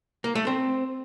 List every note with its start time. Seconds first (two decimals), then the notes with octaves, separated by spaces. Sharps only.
0.24 A#3
0.35 A3
0.47 C4